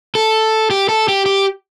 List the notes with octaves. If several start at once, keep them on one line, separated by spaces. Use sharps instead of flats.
A4
G4
A4
G4
G4